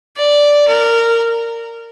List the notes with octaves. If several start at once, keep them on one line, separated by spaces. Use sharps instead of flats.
D5
A#4